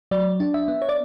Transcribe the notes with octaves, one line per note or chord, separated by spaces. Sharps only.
F#3 D5
D4
E5
B3
C#5
D5